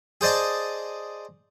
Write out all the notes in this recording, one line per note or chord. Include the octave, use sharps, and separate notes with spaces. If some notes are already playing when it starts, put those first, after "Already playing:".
G#4 C5 D5 D#5 A5